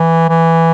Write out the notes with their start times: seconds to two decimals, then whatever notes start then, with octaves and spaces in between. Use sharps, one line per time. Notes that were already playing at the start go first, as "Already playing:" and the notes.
Already playing: E3
0.29 E3